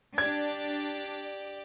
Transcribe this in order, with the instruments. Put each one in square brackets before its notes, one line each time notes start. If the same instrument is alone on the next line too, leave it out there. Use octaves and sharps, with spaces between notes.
[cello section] D4 [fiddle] G4 D5 [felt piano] G#6